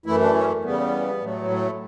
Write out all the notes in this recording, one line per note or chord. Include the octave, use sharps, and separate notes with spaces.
F#2 E3 A3 E4
D4
C#4
E2 C#3 G3 B3
A2 F#3 A3
A3